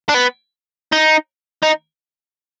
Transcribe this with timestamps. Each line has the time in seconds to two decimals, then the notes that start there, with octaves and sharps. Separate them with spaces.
0.09 D4
0.14 B3
0.92 D#4
1.63 D#4